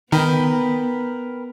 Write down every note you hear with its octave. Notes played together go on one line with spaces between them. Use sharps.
D#3 B3 A#4 B4 G5